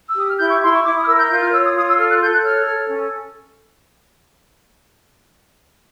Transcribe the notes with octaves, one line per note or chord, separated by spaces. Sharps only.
E6
G4 D#6
F6
E4 G6
C#6
E4 C6
C#6
E4 D6
D#6
F6
A#4 E6
G6
F4 G6
F6
C#5 E6
D#6
F4 D#6
E6
A4 F6
F#6
A4 G6
F#6
C#5 F6
A4
C#4